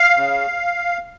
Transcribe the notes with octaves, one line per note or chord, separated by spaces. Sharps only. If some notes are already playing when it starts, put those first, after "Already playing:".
Already playing: F5
C#3